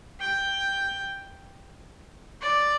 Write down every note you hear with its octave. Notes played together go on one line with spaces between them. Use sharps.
G5
D5